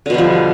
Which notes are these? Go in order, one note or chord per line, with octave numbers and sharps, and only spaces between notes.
B2 D3 F3 G3